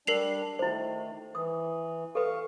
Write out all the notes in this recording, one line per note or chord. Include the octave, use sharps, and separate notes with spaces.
G3 D4 A#4 C7 F7
D#3 A3 E4 C5
E3 D#6
A4 B4 F5 C#6